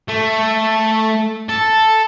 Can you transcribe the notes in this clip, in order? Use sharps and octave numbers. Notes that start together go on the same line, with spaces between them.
A3
A4